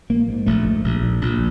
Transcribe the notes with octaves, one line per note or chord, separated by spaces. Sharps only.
A#1 A#3
G#2
A#1 A3
G#2
A#1
A#2
A#1